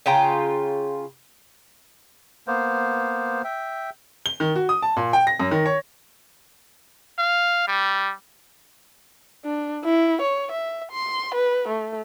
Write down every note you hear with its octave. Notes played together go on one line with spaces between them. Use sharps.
C#3 F4 G5 A#5
A#3 B3 C5
E5 G5
G7
D#3
F#4
D#6
A5
A#2
G5
A#6
F#2
D#3
C#5
F5
G3
D4
E4
C#5
E5
C6
B4
A3